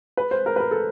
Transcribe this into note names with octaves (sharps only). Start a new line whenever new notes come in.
B4
C5
A#4
B4
A#4
A4